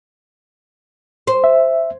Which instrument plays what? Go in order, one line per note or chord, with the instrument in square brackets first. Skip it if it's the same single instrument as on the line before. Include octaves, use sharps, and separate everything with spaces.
[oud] C5
[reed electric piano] E5